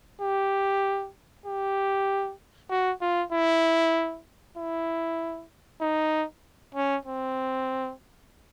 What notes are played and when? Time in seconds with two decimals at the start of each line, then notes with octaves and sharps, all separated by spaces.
0.21 G4
1.46 G4
2.70 F#4
3.01 F4
3.32 E4
4.57 E4
5.81 D#4
6.75 C#4
7.05 C4